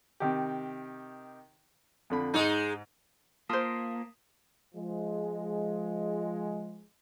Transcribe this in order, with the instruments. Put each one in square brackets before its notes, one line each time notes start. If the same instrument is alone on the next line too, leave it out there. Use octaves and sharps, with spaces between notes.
[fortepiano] C3 D#3 G4
F2 D3 B5
[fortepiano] G#2 [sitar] G#3 D#4
[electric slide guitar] A#3 [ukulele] F4 C5 [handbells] A5 D#6 B6
[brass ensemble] F3 G#3